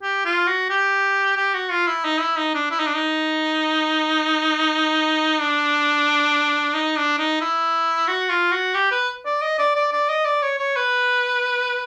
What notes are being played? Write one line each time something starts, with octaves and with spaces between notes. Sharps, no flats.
G4
F4
F#4
G4
G4
F#4
F4
E4
D#4
E4
D#4
D4
E4
D#4
D4
D#4
D4
D#4
D4
D#4
E4
F#4
F4
F#4
G4
B4
D5
D#5
D5
D5
D5
D#5
D5
C#5
C#5
B4